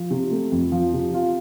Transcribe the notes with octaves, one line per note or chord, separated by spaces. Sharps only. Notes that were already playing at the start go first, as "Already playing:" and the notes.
Already playing: F3
C3
A3
F2
F3
C3
F4